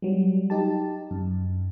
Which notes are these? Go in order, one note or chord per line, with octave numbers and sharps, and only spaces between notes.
F#3 G3
D#4 G4 A5
F#2